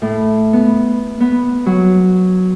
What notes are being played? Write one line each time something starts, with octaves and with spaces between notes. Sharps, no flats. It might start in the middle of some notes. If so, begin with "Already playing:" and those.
A2
B3
B3
F#3